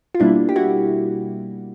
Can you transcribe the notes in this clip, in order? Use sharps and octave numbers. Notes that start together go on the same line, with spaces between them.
F4
B2 G3 A#3 D4 E4
G4
E4 F#4